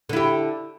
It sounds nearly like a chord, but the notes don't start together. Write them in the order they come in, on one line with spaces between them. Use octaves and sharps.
D3 E4 G4